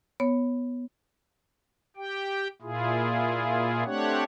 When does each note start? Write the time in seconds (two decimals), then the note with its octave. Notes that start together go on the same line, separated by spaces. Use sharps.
0.20 B3 C#5
1.96 G4 G5
2.62 A#2 E4 F4 G#4
3.85 A3 C4 D4 G4 C#5 F#5